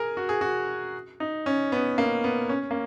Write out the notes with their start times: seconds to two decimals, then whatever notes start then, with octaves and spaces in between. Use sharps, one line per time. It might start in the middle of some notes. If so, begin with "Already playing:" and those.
Already playing: G#4 A#4
0.17 F#4
0.29 G#4
0.41 F#4
1.20 D#4
1.46 C#4
1.72 B3
1.98 A#3
2.24 B3
2.49 C#4
2.71 A#3